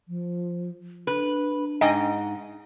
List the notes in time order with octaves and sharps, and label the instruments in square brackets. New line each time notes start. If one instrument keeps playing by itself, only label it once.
[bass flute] F3
[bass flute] D4 [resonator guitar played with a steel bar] B4
[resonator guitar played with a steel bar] G#2 [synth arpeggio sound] D#5 G5 G#5